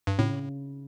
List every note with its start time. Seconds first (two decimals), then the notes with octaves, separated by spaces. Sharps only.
0.07 G2
0.18 A2 C#3